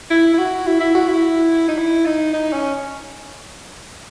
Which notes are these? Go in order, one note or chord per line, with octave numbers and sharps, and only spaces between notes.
E4
E4
F#4
E4
E4
F#4
E4
D#4
E4
D#4
D#4
C#4